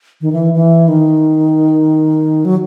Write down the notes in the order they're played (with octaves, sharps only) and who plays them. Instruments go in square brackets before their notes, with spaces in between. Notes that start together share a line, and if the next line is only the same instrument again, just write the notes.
[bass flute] D#3
E3
E3
D#3
F#3